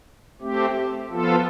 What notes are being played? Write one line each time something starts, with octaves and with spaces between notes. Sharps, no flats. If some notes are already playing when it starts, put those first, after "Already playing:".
A3 C4 G4
F3 B3 F4 A4